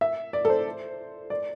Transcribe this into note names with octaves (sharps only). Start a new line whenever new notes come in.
E5
D5
A4
C5
D5